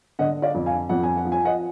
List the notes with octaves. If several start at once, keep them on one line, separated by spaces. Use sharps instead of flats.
D3 D#5 F#5
D5 F5
F2
F5 G#5
F2 F#5
G#5
F#5
F3
G#5
D#5 F#5